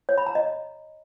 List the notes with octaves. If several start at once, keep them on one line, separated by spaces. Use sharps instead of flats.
C#5
B5
A#5
D#5